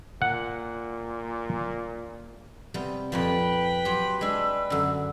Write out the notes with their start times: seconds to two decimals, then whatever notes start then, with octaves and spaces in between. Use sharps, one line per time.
0.22 A#2 F#5
2.74 C3 G3 B3
3.12 F2 A#2 F3 B4 G5
3.85 F#3 G4 C6
4.21 G#3 D4 E6
4.70 F#2 D3 E6